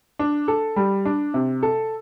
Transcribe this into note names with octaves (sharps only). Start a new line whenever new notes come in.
D4
A4
G3
D4
C3
A4